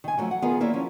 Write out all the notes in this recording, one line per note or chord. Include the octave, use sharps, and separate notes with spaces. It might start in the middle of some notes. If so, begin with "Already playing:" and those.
D#3 G#5
F3 F#3 G#3 A3 F#4
F#5
D#3 B3 F4 G#4 A#4 B4
A#3 E4 F4 C#5 D5
F3 C#4